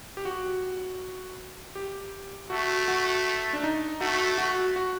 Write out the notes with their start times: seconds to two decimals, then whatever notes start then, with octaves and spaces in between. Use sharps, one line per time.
0.17 G4
0.25 F#4
1.75 G4
2.50 A3 F#4
2.88 F#4
3.53 D4
3.63 D#4
4.00 A3 F#4
4.38 F#4
4.76 F#4